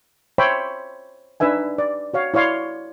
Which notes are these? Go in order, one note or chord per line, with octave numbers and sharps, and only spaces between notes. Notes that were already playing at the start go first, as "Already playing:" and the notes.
C5 C#5 E5 G5 B5 C6
D4 D#4 B4 E5 G#5
D5
F#4 C#5 F5
E4 C#5 D5 F5 C6